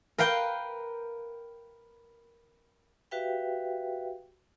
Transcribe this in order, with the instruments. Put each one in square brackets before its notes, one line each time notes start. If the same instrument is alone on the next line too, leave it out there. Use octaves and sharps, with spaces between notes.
[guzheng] A#4 B4 F5 G5
[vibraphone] F#4 G4 B4 E5 F5 G5